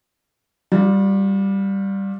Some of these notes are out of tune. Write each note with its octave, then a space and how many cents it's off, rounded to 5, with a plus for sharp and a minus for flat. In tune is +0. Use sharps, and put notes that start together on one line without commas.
G3 +0 F4 +40